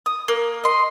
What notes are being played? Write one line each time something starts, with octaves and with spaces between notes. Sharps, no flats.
D#6
A#3
D#5 C6